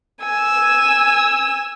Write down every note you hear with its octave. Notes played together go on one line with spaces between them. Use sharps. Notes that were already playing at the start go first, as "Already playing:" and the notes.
G#5 E6